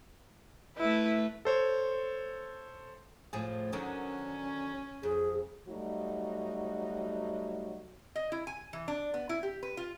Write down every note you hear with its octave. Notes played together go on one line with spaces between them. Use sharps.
A3 E4 B4
A4 C5 C#5
A2 F3 G#4
D3 D#3 F#3 C#4
F2 G#4
F#3 G3 A3 D#4 F#4
D#5
E4
G#5
E3
D4
B3
E4
G4
B4
F4